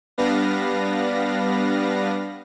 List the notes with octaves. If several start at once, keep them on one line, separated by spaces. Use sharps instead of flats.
G3 B3 D4 B4 F5 A#6